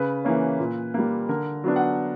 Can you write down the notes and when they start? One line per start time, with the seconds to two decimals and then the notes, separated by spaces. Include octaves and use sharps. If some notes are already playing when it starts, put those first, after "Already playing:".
Already playing: C#3 B4
0.25 E3 A#3 C#4
0.59 A#2
0.94 G3 A#3
1.29 D3 A#4
1.64 F#3 B3 D4
1.76 F#5